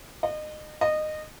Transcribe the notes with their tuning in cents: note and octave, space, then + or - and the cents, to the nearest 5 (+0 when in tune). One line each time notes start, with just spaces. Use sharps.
D#5 -30
D#5 -20